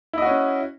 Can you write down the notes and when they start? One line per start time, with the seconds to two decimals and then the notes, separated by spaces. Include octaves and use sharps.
0.13 E4
0.18 D#5
0.22 F#4
0.26 C#4